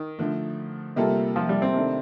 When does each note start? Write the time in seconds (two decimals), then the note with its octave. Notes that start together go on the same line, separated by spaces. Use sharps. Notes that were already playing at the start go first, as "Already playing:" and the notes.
Already playing: D#3
0.19 D3 F3 A3
0.96 C3 G3 A#3 F4 A4
1.36 F3
1.49 G3
1.62 C4
1.74 C3 D#3 A3 D4 A4